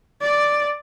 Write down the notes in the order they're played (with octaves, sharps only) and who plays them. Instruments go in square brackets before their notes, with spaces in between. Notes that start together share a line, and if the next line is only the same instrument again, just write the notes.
[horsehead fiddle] D5